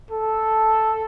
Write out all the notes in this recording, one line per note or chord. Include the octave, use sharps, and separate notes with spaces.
A4